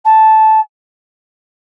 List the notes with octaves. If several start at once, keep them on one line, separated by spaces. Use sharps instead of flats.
A5